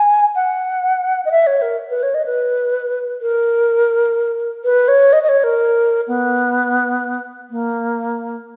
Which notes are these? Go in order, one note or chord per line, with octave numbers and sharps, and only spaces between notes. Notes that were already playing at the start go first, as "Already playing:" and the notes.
Already playing: G#5
F#5
D#5
E5
C#5
A#4
B4
C#5
D#5
B4
A#4
B4
C#5
D#5
D#5
C#5
A#4
B3
A#3